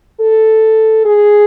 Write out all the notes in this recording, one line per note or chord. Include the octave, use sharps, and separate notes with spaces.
A4
G#4